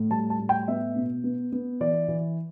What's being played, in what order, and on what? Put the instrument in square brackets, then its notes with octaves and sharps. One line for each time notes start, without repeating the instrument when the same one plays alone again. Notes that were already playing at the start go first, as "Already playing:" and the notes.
Already playing: [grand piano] A2
G3 A5
A5
A2
G5
B3 E5
B2
B3
B3
E3 D5
E3